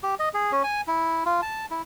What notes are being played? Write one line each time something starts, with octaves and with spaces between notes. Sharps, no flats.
G4
D#5
G#4
C#4
G#5
E4
F4
A5
E4